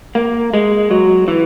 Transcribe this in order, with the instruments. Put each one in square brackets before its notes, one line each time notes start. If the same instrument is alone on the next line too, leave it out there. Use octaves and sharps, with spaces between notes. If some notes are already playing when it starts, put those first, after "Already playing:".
[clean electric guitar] A#3
G#3
F#3
E3